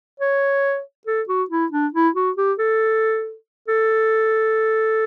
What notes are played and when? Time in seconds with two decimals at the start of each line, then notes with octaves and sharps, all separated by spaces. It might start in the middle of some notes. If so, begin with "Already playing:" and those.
0.20 C#5
1.07 A4
1.29 F#4
1.50 E4
1.72 D4
1.94 E4
2.16 F#4
2.37 G4
2.59 A4
3.68 A4